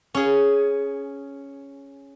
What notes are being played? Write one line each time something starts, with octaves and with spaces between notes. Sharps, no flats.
C#4 G#4